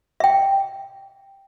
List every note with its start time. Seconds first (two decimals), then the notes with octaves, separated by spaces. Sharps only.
0.20 E5 G5